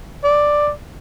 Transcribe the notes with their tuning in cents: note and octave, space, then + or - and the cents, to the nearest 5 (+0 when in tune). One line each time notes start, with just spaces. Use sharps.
D5 +5